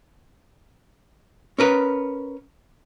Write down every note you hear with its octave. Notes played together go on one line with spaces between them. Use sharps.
C#4 A#4 B4